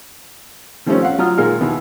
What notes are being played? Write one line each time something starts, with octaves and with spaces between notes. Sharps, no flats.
D#3 F3 G3 A3 C4 C#4
F5 F#5
F#3 F4 A#5 D#6 F6
A#2 D#3 G#3 A#4 F6
D#2 B2 D#3 E3